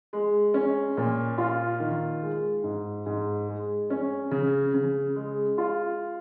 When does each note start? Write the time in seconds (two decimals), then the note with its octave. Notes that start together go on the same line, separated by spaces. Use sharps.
0.13 G#3
0.54 C#4
0.97 A#2
1.38 F4
1.80 D#3
2.22 G#3
2.64 G#2
3.06 G#2
3.49 G#3
3.90 C#4
4.31 C#3
4.74 C#3
5.16 G#3
5.58 F4